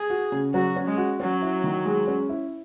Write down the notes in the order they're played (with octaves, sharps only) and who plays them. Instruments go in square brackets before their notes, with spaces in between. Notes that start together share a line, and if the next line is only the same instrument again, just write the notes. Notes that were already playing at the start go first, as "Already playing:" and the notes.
Already playing: [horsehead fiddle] G#4
[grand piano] F#4
C#3
[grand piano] F#3 [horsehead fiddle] F#4
[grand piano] C#4
[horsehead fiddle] G#3
[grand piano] F#4
[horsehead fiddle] F#3 [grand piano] C#4
[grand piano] E4
D#3
G#3
C#4
E4